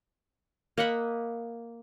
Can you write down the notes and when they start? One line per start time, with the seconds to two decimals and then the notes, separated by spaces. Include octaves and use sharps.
0.78 A#3 D#5 F#5 B5